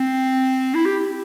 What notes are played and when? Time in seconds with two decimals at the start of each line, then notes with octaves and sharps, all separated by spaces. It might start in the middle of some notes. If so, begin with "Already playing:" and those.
Already playing: C4
0.74 E4
0.86 G4